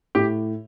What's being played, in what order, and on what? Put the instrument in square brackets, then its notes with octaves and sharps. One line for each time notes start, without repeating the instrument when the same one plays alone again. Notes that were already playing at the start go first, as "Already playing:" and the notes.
[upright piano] A2 [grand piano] G4